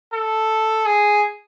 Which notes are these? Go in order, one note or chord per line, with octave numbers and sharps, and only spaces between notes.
A4
G#4